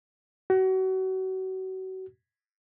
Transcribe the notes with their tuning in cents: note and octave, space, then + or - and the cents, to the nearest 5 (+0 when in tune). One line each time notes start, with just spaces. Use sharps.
F#4 +30